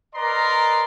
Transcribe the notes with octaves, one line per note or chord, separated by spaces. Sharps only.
A#4 B4 D5 D#5 A#5 C6